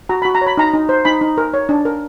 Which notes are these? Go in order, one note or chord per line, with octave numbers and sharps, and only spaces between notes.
F#4 A#5
F#4 B5
A#5
C#5
B5
D#4 A#5
D#4
C5
D#4 B5
D#4
A#4
C#5
D4
A#4